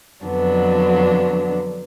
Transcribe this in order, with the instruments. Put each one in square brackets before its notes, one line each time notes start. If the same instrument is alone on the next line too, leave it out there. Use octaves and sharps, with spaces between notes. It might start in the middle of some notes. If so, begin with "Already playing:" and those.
[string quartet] F2 D3 F#3 B3 D4